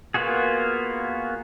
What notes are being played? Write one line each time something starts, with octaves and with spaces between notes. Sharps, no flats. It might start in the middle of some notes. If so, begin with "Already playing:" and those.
A#3 B3 F4 F#4 G#4